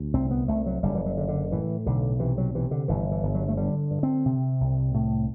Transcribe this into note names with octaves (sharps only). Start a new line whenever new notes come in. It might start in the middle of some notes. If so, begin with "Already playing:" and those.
Already playing: D2
C2 C4
B3
C2 A3
F#3
F#1 G3
E3
F#3
D3
D3
A2 E3
B1 D3
C3 E3
F#3
C3 E3
D3
G1 E3
E3
G1
F#3
A3
D3 G3
G2
C4
C3
C2
A2